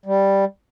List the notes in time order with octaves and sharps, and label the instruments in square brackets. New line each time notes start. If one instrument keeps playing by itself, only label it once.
[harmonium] G3